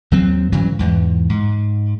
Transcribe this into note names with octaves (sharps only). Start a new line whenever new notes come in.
D#2 F#3 C4
G2 C#3 E3 F#3
E2 G#2
G#2